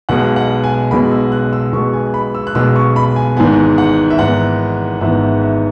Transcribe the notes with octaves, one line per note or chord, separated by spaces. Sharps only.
B1 B2 G#3 B3 F#5
F#5
G#5
B1 B2 G#3 B3 B5
E6
F#6
E6
B1 B2 G#3 B3 C#6
G#5
B5
E6
F#6
B1 B2 G#3 B3 E6
C#6
B5
G#5
G#1 G#2 E3 B3 G#5
F#5
E5
G#1 G#2 E3 B3 F#5
G#1 G#2 E3 B3 E5
E5
E5